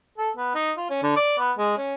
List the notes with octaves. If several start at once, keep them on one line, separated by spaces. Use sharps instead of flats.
A4
B3
D#4
F4
C#4
D3
D5
B3
G#3
C#4